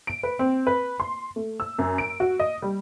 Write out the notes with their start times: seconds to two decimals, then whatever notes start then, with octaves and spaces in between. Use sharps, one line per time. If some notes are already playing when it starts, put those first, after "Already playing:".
0.07 D7
0.23 B4
0.39 C4
0.67 B4
1.00 C6
1.36 A3
1.60 E6
1.79 F#2
1.98 D7
2.20 F#4
2.40 D#5
2.62 G3